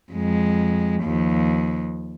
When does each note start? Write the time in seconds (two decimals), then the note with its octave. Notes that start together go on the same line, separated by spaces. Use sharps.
0.12 F2 G#3
1.03 D#2 F3